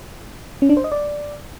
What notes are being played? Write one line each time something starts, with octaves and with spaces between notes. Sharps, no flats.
C#4
D4
C5
D#5
D5